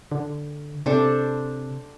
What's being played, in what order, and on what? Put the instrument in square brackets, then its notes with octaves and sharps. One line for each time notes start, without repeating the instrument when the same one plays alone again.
[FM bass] D3
[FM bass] C3 [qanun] D4 A4 C5